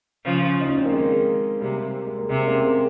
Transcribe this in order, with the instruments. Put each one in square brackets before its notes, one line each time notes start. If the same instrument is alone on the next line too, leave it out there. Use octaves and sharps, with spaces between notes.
[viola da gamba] C#3 F3
[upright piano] D#4
C#4
C4
A#3
[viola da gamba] D#3 [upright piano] G#3
[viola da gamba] C3 [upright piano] G3 A#3
[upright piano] G#3
A#3
[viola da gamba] C3 [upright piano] G#3 C4
[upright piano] A#3 C#4
G#3 C4